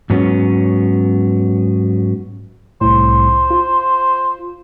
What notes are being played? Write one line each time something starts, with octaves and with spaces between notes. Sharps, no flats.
G#2 F#3 B3 C#4
C2 A2 C5
F4